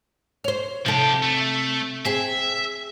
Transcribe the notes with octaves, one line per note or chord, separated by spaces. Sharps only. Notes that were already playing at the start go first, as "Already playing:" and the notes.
C5 C#5
C3 F3 G4 A4
A3
C4 G#4 E5